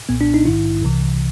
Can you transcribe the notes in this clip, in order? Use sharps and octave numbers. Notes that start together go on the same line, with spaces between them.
B1 A#2 B3
D4
D#4
A#1 G#2 D#3 E4
C2 C3 E3